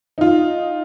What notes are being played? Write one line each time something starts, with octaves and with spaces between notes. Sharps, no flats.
D#4 F4